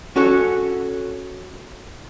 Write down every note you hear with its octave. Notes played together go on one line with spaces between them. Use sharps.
C#4 F#4 A4 C#5